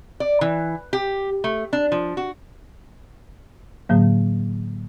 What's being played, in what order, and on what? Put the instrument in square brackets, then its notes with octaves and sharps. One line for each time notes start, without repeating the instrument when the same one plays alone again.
[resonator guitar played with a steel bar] D5
E3
G4
A3
D4
F3
F#4
[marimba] A2 D3 F#3 A#3